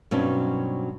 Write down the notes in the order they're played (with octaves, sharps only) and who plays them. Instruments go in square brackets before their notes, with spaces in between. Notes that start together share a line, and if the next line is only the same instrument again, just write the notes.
[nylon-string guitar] G2 B2 F#3 C4 C#4 D#4